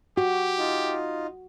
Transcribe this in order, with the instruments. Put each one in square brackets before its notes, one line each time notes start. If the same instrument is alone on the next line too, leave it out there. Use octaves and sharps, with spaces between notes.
[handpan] F#4 [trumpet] G4
[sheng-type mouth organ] D#4 F4